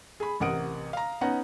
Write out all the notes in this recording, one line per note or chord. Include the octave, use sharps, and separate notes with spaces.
G#4 B5
A1 C3 A#4 F#5 D#6 D7
F5 A#5
B3 C#4 D#4 F#5 A#5